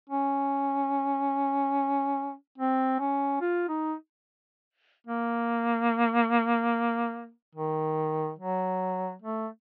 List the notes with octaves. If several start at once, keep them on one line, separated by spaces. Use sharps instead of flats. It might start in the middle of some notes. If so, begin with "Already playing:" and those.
C#4
C4
C#4
F4
D#4
A#3
D#3
F#3
A3